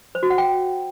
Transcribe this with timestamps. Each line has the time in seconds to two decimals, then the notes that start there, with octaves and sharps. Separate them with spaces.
0.15 C5
0.23 F#4
0.30 F#5
0.38 G5